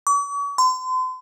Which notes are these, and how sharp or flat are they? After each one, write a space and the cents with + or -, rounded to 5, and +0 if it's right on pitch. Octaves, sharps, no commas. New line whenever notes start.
C#6 +40
C6 -40